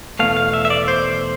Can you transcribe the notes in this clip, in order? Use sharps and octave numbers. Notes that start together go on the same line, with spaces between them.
E2 B2 A3 F5
F5
E5
E5
D5
C5